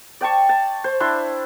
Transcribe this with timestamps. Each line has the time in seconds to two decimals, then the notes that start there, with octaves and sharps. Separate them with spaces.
0.21 D5 G5 A5 C#6
0.49 A5
0.84 C5
1.00 D4 E4 C6